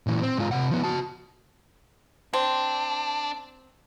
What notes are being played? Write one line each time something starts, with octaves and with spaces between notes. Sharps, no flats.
A#2 E3
C4
G#2 F4
C3 F#5
F3 B3
F#4 A5
C4 D4